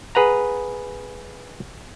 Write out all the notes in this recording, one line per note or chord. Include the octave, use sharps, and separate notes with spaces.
G#4 B4 F#5 A#5